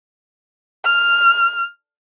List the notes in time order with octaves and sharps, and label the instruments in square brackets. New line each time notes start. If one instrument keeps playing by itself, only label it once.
[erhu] F6